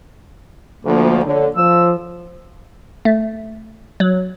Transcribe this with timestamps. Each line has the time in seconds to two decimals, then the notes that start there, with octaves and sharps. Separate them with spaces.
0.85 D2 F3 A#3
1.25 D3 C#5
1.56 F3 E6
3.05 A3
4.00 F#3